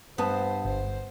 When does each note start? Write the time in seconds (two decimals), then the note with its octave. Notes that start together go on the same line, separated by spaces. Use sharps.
0.18 G2 B3 C5 A5
0.65 G1 C5